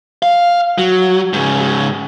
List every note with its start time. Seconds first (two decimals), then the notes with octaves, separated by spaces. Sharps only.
0.23 F5
0.78 F#3
1.33 G#2 C#3